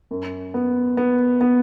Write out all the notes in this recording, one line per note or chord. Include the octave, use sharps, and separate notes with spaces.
F#2
B3
B3
B3